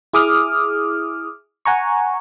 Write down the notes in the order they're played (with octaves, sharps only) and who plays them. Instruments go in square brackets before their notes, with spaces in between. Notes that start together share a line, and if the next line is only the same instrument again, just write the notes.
[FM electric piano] E4 G#4 D6 D#6 F6
F#5 G#5 A#5 C#6